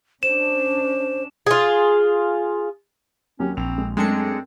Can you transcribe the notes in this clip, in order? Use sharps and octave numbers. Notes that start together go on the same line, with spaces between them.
C#4 D4 C5 E7
F4 G#4
D#2 F#3 C#4 G4
A#1 C4 F7
G#3
F#2 G#3 A3 C4 D4 C#7